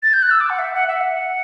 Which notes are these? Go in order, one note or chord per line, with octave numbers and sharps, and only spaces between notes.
A6
G6
F#6
E6
D6
F#5
E5
F#5
E5
F#5